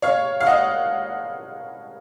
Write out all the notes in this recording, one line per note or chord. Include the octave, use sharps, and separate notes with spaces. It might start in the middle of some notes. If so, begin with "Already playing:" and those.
C#5 F5
F5
D#5 F#5